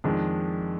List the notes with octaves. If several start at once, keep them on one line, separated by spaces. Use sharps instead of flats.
F2 D#3 G#3 D4